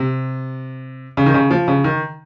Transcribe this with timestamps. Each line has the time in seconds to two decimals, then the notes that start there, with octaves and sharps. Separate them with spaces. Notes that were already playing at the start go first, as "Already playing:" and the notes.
Already playing: C3
1.17 C#3
1.26 D#3
1.34 C#3
1.51 F3
1.68 C#3
1.84 D#3